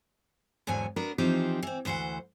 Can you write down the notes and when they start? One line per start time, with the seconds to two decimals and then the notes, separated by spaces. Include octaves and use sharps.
0.67 E2 G#2 D3 F#3 G#5
0.96 B3 D4 F#4 A#4
1.18 E3 F3 C4 D#4 G4
1.63 E3 C4
1.85 D2 E3 C5 E5 F#5